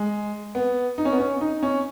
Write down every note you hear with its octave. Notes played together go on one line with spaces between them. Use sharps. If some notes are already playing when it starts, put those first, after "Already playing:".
Already playing: G#3
B3
D#4
C#4
B3
C#4
D#4
C#4